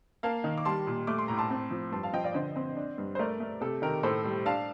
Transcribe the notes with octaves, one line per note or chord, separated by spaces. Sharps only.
A#3 F5 A5
D#3
D6
G3 A5 C6
A#2
A3 D6
C6
A2 A#5
A5 C6
C4
F3
G2 A5 C6
F5 A5
F3 D#5 G5
D5 F5
D3 C5 D#5
C4
D4
G2
C5
A3 A#4 D5
A3
C3 A4
D#3 G4 A#4
A2 A4 C5
G3
D4 F5 A5